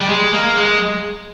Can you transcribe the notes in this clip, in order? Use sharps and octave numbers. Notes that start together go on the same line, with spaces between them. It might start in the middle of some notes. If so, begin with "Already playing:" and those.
G3
G#3
A#3
G#3